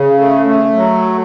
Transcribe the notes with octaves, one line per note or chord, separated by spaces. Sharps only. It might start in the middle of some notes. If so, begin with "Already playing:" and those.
Already playing: C#3
A3
A3
F#3